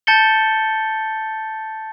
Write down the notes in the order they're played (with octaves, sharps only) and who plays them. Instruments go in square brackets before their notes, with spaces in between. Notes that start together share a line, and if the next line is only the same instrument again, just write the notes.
[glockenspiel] A5 G6 A6 C#7 G7